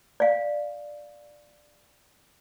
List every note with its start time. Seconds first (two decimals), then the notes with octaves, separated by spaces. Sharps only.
0.20 D5 F5